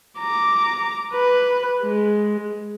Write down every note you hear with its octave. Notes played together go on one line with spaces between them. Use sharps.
A#5 D6
B4
G#3